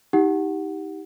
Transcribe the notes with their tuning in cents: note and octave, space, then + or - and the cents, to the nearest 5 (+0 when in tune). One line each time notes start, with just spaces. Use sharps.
D#4 +35 G4 +0 F#5 +0